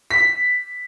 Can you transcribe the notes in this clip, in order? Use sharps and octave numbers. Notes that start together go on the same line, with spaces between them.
B6